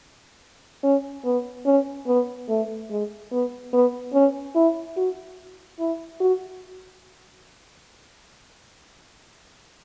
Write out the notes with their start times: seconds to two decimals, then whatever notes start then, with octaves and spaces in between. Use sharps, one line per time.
0.83 C#4
1.25 B3
1.66 C#4
2.07 B3
2.49 A3
2.90 G#3
3.31 B3
3.73 B3
4.14 C#4
4.55 E4
4.97 F#4
5.79 E4
6.20 F#4